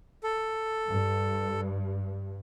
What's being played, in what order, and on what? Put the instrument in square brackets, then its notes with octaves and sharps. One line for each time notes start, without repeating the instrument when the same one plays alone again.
[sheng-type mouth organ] A4
[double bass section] G2